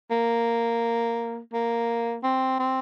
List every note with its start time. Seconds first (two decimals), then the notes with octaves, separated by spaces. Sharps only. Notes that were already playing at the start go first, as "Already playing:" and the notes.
0.11 A#3
1.53 A#3
2.24 C4
2.59 C4